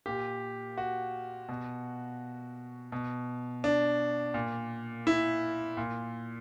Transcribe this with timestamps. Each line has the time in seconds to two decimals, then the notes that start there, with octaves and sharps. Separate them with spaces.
0.06 A#2 G4
0.78 F#4
1.49 B2
2.92 B2
3.64 D4
4.34 A#2
5.07 E4
5.77 A#2